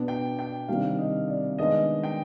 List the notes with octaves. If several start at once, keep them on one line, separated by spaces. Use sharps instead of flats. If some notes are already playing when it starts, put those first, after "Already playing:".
Already playing: B2 B3 D4
G5
G5
C3 D#3 G3 D4 F5
D#5
D5
D#3 G#3 B3 D4 D#5
G5